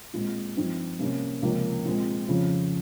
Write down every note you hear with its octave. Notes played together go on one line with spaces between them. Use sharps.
A#2 G#3 C4
G2 F3 C4 D#4
C3 G3 A#3 C#4
C#2 C3 F3 A#3 C#4
A#2 G#3 C4
F2 C#3 F3